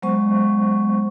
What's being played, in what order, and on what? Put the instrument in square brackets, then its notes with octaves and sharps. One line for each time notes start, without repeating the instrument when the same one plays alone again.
[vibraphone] F#3 G#3 B3 C5 C#6